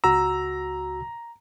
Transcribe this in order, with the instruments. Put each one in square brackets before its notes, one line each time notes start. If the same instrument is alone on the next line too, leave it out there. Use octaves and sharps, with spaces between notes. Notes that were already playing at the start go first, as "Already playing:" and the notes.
[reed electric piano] C#2 F#4 E6 [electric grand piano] A#5